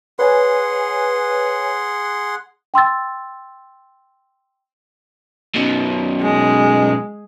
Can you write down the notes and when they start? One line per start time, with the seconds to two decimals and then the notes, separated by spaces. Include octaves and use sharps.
0.19 G#4 B4 C#5 F#5 G#5 C6
2.74 G5 C6 E6 A6
5.55 F#2 B2
6.21 G#3